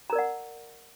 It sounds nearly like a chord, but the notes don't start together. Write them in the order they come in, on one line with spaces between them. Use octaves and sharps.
A#5 A#4 D5 F#5